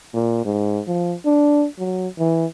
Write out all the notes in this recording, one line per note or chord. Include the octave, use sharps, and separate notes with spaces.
A#2
G#2
F3
D4
F#3
E3